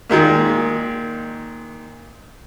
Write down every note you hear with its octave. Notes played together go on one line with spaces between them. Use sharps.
A#2 D#3 G#3 A#3